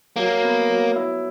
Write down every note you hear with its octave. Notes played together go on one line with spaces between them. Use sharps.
F#3 A#3
B3
F#3
E4